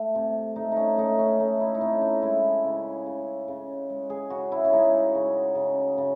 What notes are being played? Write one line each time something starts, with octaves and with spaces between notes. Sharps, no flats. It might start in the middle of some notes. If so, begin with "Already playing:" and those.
Already playing: A3
C3
A3 D#4
C#4 D#4
A3 D#4
C#4
A3 D#4
E4
D#4
C3 C#4
D#4
G#3 E4
C#3
C#3
C#3
G#3
G#4
C#3 F#4
E4
C#4
G#3 D#4
C#3
C#3
C#3